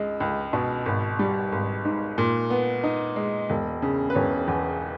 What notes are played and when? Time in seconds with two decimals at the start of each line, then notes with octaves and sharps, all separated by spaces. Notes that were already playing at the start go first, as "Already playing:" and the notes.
Already playing: C#2 G#3
0.20 C#2
0.53 B2
0.86 G#1
1.19 G3
1.52 G#1
1.85 G#2
2.18 A#2
2.50 B3
2.83 D#4
3.16 G#3
3.50 E1
3.82 C#3
4.10 B4
4.15 E1 C#5
4.48 E2